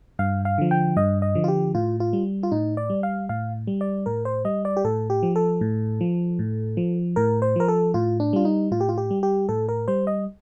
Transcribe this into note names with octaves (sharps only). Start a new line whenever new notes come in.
G2 F5
F5
D3 F3
G5
G2 D#5
D#5
D3 F3
F4
G4
A2 F4
F4
G3
F4
A2 D#4
D5
G3
F5
A2 F5
G3
D5
A2 A#4
C5
G3 D#5
D5
G4
A2 A4
G4
F3
A4
A2
F3
A2
F3
A2 A#4
C5
F3 A#4
A4
A2 F4
D4
G3 F4
D#4
A2 F4
G4
F4
G4
G3
G4
A2 A4
A#4
G3 C5
D#5